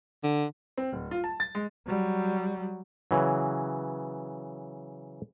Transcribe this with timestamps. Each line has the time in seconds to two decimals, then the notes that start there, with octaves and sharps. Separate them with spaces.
0.24 D3
0.77 C4
0.93 D1
1.11 F4
1.24 A5
1.40 A6
1.55 G#3
1.86 F#3 G3
3.11 C#3 E3 F#3